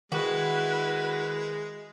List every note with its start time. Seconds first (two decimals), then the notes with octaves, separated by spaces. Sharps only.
0.12 D#3 G#3 E4 F#4 B4